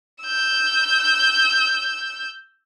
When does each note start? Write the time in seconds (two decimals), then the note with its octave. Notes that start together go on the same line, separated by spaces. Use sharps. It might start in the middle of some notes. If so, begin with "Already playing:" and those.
0.24 E6 G6